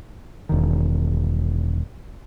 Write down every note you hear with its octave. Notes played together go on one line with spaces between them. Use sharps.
E1 D#3